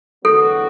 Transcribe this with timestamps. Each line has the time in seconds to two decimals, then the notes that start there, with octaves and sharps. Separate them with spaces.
0.24 E2 D3 F#3 B3 F#4 A4